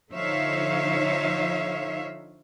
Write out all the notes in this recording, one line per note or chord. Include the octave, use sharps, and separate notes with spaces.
D3 F3 D#4 C#5 E5 F5